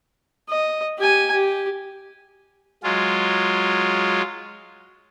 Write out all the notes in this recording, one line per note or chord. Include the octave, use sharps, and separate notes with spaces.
D#5
G4 G#5
G4
F#3 G#3 F4